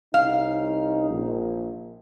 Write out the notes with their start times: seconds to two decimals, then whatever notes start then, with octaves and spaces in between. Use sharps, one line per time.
0.14 C2 C#4 D#4 F5
1.10 A#1